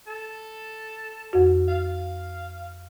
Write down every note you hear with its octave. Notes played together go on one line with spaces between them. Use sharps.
A4
F2 F#4
F5